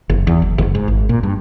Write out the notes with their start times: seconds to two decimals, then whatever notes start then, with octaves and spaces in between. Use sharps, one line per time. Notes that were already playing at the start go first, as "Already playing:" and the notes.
0.09 F#1
0.27 E2
0.42 F#1
0.58 F#1
0.75 G#2
0.88 G#1
1.09 A#2
1.23 G2